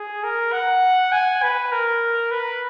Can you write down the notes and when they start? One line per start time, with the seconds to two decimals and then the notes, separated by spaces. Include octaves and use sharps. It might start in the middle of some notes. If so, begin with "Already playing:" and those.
Already playing: G#4
0.24 A#4
0.52 F#5
1.12 G#5
1.42 B4
1.72 A#4
2.31 B4